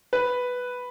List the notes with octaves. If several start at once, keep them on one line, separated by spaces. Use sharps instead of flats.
B4